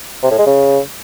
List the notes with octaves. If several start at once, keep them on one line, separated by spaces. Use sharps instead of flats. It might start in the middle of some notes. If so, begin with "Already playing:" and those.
C3
A2
G#3
C#3